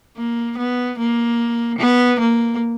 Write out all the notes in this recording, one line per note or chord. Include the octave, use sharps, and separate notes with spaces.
A#3
B3
A#3
B3
A#3